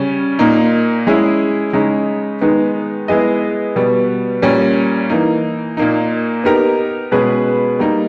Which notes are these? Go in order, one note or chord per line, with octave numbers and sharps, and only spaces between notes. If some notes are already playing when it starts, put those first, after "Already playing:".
Already playing: C#3 G3 C#4
A#2 A#3 D#4
G#3 C#4 E4 G#4
C#3 G#3 D#4
D#3 G#3 B3 D#4
G#3 B3 E4 G#4 D#5
B2 G3 B3
A#2 G3 C#4
E3 A#3 D#4
A#2 A#3 D#4
B3 D#4 G4 A#4
B2 G#3 C#4 G#4 B4
G3 A#3 D#4